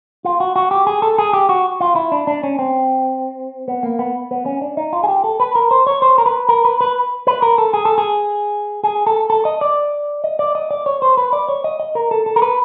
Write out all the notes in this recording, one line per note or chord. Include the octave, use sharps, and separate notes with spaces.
F4
F#4
F#4
G4
G#4
A4
G#4
G4
F#4
F4
E4
D4
D4
C#4
C4
B3
A#3
B3
B3
C#4
D4
D#4
F4
G#4
G4
A4
B4
A#4
C5
C#5
C5
A#4
B4
A#4
B4
B4
B4
A#4
A4
G#4
A4
G#4
G#4
A4
A4
D#5
D5
D#5
D5
D#5
D5
C#5
C5
B4
D5
C#5
D#5
D#5
A#4
A4
A4
A#4
B4